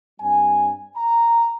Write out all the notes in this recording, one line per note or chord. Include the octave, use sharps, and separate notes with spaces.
G2 G3 C4 G#5
A#5